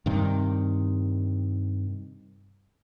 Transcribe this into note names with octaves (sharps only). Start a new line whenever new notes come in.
G2 C3 D#3